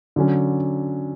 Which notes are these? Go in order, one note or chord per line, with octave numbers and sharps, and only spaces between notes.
D3 F#3 C#4